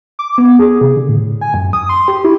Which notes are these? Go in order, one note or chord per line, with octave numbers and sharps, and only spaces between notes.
D6
B3
G#4
C3
D3
A2
G#5
F#2
D#6
C6
G4
E4